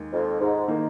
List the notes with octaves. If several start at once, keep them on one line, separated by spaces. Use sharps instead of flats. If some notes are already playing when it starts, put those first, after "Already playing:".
Already playing: D#2 D#3 G#3
F2
G#2
D#3 A#3 D#4